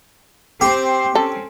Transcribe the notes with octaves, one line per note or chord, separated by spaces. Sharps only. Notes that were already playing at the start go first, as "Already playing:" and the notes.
C4 G4 C5
C4 C#4 A4